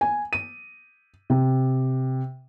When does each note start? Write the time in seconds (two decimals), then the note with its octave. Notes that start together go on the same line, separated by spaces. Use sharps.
0.01 G#5
0.33 D#7
1.30 C3